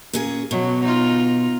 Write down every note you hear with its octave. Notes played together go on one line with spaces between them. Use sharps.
A#2 C#4 G#4
B2 F#3
D#4 F4